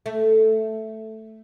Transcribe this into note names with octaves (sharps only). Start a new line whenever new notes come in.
A3